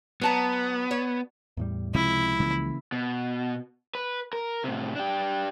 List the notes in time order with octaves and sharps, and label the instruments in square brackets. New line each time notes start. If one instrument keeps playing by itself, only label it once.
[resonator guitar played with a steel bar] F#3 A5 A#5 [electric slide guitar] B3
[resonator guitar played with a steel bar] C#5
[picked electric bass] E2 A2 G3
[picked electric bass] C#2 F3 G#3 [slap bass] C3 [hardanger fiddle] E4
[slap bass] C#3 E3 A#3
[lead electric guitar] B2
B4
A#4
A2 C3
D4 G4